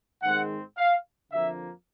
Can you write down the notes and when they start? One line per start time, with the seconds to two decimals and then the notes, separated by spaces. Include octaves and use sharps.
0.23 G#2 D#3 G#3 C4 F#5
0.77 F5
1.32 F2 D3 F3 A#3 E5